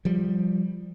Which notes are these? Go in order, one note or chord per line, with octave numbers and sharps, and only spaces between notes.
F3 G3